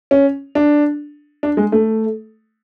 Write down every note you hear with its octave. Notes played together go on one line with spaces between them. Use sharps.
C#4
D4
D4
G#3
A3